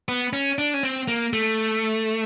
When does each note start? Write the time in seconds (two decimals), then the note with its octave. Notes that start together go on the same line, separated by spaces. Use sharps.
0.08 B3
0.33 C#4
0.58 D4
0.74 C#4
0.83 C4
1.08 A#3
1.33 A3